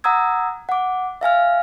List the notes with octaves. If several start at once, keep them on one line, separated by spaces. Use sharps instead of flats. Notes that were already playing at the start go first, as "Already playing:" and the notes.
F#5 A#5 D#6 E6 G#6
F#5 D6
E5 F5 G#5 F6